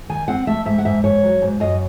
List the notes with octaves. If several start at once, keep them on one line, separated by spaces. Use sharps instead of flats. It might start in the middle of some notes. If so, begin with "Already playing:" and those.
D#3 G#5
C4 F#5
A3 E5
G#2 E5
F#5
G#2 E5
G#2 C#5
F#3
G#2
F#2 D#5